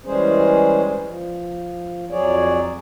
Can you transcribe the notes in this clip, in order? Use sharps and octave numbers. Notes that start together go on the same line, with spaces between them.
E3 G3 G#3 C#4 G#4 C5
F3
F2 F#3 G#4 C#5 D5